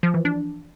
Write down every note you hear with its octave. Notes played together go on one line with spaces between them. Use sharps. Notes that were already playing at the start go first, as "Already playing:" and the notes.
F3
E3
D4